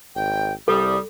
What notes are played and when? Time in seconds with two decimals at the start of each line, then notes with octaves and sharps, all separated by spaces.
0.16 G#1 G5
0.68 C2 G3 A4 D#6